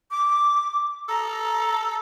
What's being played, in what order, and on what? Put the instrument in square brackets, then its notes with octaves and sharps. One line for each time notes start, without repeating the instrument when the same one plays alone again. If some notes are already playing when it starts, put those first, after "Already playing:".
[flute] D6
[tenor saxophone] A4 [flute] A#5